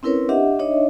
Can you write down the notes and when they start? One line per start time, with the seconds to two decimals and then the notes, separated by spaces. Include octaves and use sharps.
0.03 C4 C#4 E4 A#4 B4 C#5
0.29 D4 G4 D#5 E5 F#5
0.59 D4 D#4 C#5 D#5 E5